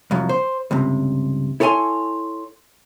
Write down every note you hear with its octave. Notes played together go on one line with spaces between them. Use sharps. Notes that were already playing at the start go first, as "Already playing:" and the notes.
C2 F2 F3 F#3
C5
C#2 G2 C3
E4 A4 C#5 F#5 G#5 C6